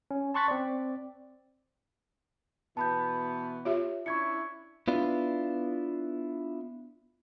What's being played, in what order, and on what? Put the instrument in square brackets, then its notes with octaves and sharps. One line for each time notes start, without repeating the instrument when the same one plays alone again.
[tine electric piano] C#4
A5 C6 C#6 F#6 A6 B6
C4 D5
[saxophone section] B2 E3 B3 [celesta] A5 B5 G6
[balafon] F4 G4 E5 [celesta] C#5
[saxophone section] C#4 D4 E4 [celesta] C#6 G#6 C#7
[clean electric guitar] B3 D4 E4 F4